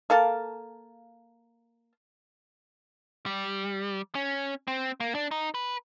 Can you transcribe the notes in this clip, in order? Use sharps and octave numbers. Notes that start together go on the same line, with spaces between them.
A#3 A4 F5 A5
G3
C#4
C4
A#3
D4
D#4
B4